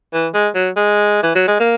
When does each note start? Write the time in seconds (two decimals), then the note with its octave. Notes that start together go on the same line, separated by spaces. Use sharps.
0.13 E3
0.34 G#3
0.55 F#3
0.76 G#3
1.23 E3
1.35 F#3
1.47 G#3
1.60 A#3